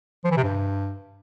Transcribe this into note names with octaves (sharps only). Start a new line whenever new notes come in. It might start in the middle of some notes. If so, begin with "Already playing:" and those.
F3
E3
C3
G2